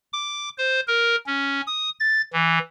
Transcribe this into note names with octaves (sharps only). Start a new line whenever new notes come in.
D6
C5
A#4
C#4
D#6
A6
E3